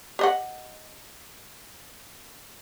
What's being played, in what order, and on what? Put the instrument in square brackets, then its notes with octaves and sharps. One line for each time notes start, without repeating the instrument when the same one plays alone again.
[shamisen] G4 D#5 F#5